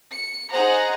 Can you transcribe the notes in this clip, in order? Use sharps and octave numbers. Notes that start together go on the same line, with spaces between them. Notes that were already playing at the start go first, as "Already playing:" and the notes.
C#7
D#4 G#4 C5 F#5 A#5